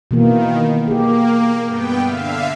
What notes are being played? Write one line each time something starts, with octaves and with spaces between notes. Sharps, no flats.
B2 D#3 E3 A#3
A#3 G4 G#4
G2 B3 G5
D3 E5 F5